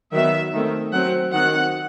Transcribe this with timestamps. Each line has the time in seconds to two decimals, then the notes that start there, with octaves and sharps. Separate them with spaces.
0.12 D#3 F#3 B3 E5
0.53 D#3 A3 C4
0.93 F#3 C4 F#5
1.33 D#3 F#3 C4 F#5